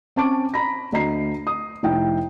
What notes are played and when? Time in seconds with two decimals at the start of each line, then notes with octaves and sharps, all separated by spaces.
0.16 C4 C#4 A5 C#6 D6 D7
0.54 A#5 B5 A#6
0.92 D2 D#5 A#5 C7
1.47 D#6
1.83 F1 D#4 E4 G5